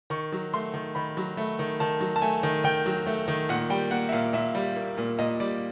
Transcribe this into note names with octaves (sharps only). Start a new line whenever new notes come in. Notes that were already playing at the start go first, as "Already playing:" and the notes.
D#3 C#6
F#3
A3 C6
D#3
D#3 B5
F#3
A3
D#3
D#3 A5
F#3
A5
A3 G#5
D#3
D#3 G5
F#3
A3
D#3
A#2 F#5
G3 G5
A#3 F#5
E5
A#2 F5
A#2 E5
G3
A#3
A#2
A#2 D#5
G3 D5